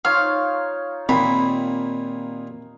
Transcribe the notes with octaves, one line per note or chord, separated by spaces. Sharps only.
D#4 F4 C#5 F5
D#2 A#2 C4 B5